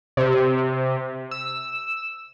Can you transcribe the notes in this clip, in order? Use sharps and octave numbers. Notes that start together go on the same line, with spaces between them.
C3
E6